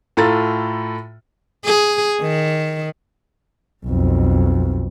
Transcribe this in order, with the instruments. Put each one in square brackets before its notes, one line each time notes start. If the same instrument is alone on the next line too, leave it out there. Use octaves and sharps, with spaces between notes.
[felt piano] A2 F4 A4 A#5 A6
[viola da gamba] G#4
D#3
[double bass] B1 F2